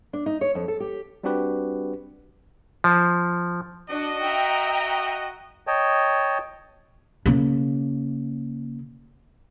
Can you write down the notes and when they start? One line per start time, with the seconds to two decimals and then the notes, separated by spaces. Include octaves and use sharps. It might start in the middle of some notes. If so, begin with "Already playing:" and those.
0.13 D4
0.26 D#4
0.41 C#5
0.55 F2
0.68 A4
0.80 G4
1.23 G3 C4 D4 F#4 G4 B4
2.84 F3
3.90 D4 F#4 D#5
4.22 E5 G5 A#5
5.67 C#5 D#5 G5 A5
7.26 C#3 A#3